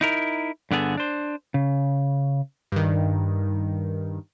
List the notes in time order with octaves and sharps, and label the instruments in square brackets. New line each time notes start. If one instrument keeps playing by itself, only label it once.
[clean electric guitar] D#4 E4 A#4
G2 D3 B3 G#4 A4
D4 C5
C#3
[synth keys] G2 D#3